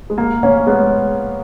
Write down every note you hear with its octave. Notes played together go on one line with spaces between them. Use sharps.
G#3
A#3
A#3 C#4
G#3 B3